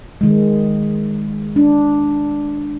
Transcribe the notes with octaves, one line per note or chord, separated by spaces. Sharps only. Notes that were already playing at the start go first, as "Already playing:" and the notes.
D#3 G#3
D4